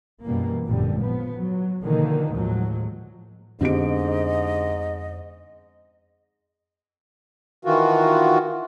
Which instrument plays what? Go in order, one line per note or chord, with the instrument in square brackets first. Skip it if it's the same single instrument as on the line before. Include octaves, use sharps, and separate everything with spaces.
[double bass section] F#2 B2 E3 G3 A#3
G#1 F#2 A#2 D3 G3
F3 B3
F#3
B2 D3 D#3 F3 A#3
D#2 A2 F3 F#3 G#3
[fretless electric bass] F2 B3 C4 [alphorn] G#2 [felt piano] D3 G4 D7 [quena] D#5
[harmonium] D#3 E3 F4 F#4